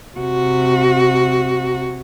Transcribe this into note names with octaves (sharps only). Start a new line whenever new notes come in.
C3 F#4